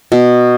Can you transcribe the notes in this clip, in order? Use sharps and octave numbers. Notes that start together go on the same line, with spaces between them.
B2